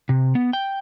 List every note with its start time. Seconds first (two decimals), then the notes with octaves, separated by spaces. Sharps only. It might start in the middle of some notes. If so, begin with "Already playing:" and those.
0.09 C3
0.35 B3
0.53 G5